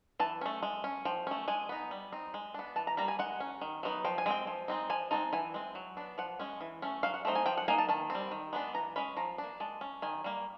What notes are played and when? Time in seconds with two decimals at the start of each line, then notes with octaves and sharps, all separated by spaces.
0.20 E3 A5
0.41 A3 C#4
0.62 G#3
0.84 C#4
1.05 F3 G5
1.27 A3 C#4
1.48 G#3 G#5
1.69 B3 D#4
1.91 G3
2.12 C4 D#4
2.34 G#3
2.54 B3 D4
2.76 E3 A5
2.87 A#5
2.97 G3 A#3 A#5
3.08 G#5
3.19 G#3 F#5
3.40 C#4
3.61 D#3
3.83 F#3 B3 D#4
4.05 F3 G5
4.18 G#5
4.26 G#3 C4 G5
4.47 F3
4.68 G#3 C4 D#4
4.90 F3 G#5
5.11 G#3 C4 D#4 A5
5.33 E3 G#5
5.54 G#3 C4
5.75 F#3
5.97 B3 D4
6.18 F3 F#5
6.39 G#3 C#4
6.61 E3
6.82 A3 C#4
7.03 F#3 F5
7.14 F#5
7.25 A3 C4 D#4
7.35 G#5
7.46 F3 G5
7.57 F#5
7.68 A#3 D#4 G#5
7.78 A5
7.89 D#3 A5
8.10 C4
8.15 G3
8.31 D#3
8.53 G#3 B3 D4
8.74 E3 A#5
8.96 G#3 C#4 B5
9.17 F3 A#5
9.38 A#3 D4
9.60 G#3 A5
9.81 C#4
10.02 D#3 G#5
10.24 G3 A#3